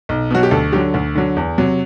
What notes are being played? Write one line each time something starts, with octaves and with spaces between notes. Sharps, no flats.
B1
B2 F#3 F#4
G4
D2 A4
D3 F#3 G4
D2
D3 F#3
E2
C3 F#3